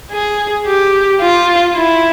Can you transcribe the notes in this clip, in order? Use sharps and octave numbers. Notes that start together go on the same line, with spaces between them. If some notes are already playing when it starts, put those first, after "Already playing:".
G#4
G4
F4
E4